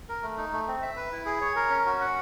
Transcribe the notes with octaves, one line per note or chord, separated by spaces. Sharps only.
A#4
A3
D#4
A3
C4
E5
B4
E4
G#4
C#5
A#4
C#4
F#4
F#5